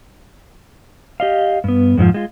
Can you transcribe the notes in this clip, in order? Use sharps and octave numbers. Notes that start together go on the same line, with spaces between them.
G4 D#5 F5
G2 B3
F2 G#2 E3 F3
G#3 F4